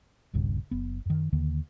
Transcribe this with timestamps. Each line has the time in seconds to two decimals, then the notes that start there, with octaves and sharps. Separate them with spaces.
0.33 D#1 B1 G2 C#3
0.71 F#1 B3
1.06 F#2 D#3
1.32 D#2 D3 D#3 A#3